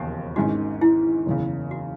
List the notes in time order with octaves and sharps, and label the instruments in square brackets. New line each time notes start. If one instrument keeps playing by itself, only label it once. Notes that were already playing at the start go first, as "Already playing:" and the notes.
Already playing: [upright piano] E1 D#2 C#3 F3 [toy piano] G4
[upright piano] G#1 G#2 D#3 G#3 C#4 [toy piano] F#4
[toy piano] E4
[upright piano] F#1 E2 C#3
[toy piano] F#4